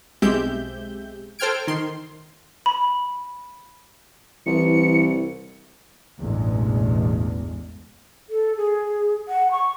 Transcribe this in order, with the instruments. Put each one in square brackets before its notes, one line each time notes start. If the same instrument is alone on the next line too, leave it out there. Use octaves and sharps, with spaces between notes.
[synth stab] B1 G#3 C4 G4 E5 G6
A4 C5 G5 F6 G#6 D7
D#3 C6
[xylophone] B5
[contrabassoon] C2 [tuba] E3 [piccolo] C#7
[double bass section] A1 E2 G2 B2 G#3
[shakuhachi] A4
G#4
F#5
C#6